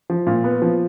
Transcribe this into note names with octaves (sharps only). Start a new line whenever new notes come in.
F3
A#2
B3
F3